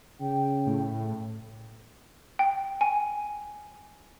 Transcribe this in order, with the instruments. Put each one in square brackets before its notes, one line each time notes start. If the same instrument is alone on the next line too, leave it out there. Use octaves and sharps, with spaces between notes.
[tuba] C#3 [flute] G5
[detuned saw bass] A2
[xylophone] G5
G#5